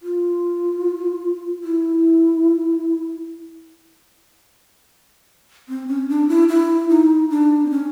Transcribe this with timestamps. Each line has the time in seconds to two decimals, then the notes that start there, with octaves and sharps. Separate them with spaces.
0.02 F4
1.64 E4
5.69 C4
5.88 C#4
6.09 D4
6.29 E4
6.48 E4
6.89 D#4
7.30 D4
7.66 C4
7.70 C#4